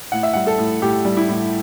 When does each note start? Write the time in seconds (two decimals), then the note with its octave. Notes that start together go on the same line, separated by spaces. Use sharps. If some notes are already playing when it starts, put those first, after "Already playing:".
0.12 A2 F#5
0.23 E5
0.33 G3 F#5
0.47 A4
0.58 A2
0.82 A2 G4
1.05 G3
1.17 E4
1.28 A2